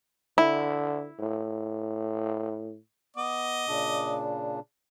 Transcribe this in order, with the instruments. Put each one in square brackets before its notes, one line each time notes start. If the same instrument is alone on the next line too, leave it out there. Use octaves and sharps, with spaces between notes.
[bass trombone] D3 [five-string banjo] E4
[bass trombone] A2
[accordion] B3 [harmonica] D#5 D6
[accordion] A#2 C#3 D4